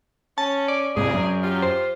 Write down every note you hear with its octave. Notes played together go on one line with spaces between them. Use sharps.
C#4 A5
D5
G#2 C3 G#4
F#2
F4 G4
C5